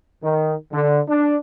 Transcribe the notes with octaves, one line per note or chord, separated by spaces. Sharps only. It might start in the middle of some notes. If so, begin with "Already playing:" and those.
D#3
D3
D4